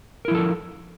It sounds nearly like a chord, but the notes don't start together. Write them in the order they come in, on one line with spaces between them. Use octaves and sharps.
A#4 E4 F3 A4